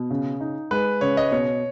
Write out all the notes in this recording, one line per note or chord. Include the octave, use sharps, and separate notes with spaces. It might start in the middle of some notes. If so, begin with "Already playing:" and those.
Already playing: B2
C#3
D#4
G#3 B4
C#3 C#5
D#5
B2 C#5